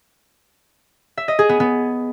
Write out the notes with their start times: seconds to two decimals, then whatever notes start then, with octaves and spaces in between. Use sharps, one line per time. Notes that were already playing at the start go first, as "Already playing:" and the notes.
1.17 E5
1.28 D#5
1.39 G#4
1.49 B3
1.60 B3